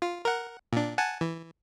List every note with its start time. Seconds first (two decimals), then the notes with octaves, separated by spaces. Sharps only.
0.02 F4
0.25 A#4 F#5
0.73 A#2 D4
0.98 F#5 G#5 A5
1.21 E3